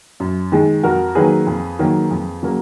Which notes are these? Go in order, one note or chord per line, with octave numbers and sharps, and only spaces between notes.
F#2
D#3 G#3
F2 F#4 A#4
D#3 F#3 A#3 G#4 B4
F2
D#3 F#3 A#3
F2
C#3 F#3 A#3